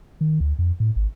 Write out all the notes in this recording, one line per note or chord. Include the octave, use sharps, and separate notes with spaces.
D#3
D2
F2
A2
G#1